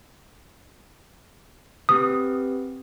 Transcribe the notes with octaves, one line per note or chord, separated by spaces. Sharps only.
C4 G4 B4 D#6